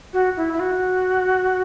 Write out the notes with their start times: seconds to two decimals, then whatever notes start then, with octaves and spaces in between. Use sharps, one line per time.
0.13 F#4
0.37 E4
0.53 E4
0.60 F#4